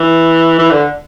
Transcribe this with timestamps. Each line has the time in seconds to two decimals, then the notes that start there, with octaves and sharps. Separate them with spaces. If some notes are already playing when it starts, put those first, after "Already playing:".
Already playing: E3
0.59 E3
0.71 D3